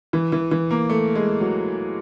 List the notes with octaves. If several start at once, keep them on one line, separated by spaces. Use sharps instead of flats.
E3
E3
E3
A#3
A3
G#3
F#3